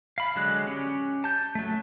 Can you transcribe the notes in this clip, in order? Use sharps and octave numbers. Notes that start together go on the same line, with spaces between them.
F5 B5
D3 F#3 G#3 F#6
C#4 G4
A5 G6
F#3 A3